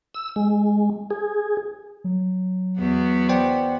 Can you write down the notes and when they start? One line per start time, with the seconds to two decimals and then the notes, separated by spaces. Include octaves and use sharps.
0.14 E6
0.36 G#3
1.11 G#4
2.04 F#3
2.78 E2 B3 F#4
3.29 C5 D5 G5